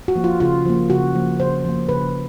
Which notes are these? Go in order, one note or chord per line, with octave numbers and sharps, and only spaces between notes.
F#4
F3 A#3
F4
C#3 F4
F3 A#3
C#3 F#4
F3 A#3
C#3 C5
F3 A#3
C#3 B4